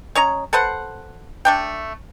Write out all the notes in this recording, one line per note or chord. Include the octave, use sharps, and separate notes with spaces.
C#4 C#5 D#5 A#5
A4 B4 C5 F#5
A3 D4 G5